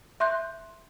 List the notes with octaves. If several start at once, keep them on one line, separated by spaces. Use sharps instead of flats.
E5 C6 F#6 G6